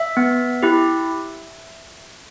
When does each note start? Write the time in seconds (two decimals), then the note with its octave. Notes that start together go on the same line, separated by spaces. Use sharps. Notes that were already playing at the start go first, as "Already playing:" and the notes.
Already playing: E5
0.17 B3
0.63 E4 G4